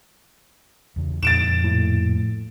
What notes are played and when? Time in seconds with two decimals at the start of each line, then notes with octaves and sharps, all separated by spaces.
0.96 E2 C#3
1.23 F2 A#2 A6 D7 E7
1.64 A2